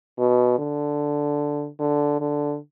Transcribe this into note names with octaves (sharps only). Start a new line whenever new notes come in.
B2
D3
D3
D3